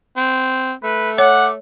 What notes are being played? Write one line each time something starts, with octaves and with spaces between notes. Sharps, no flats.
C4
A3 B4
C#5 F#5 D6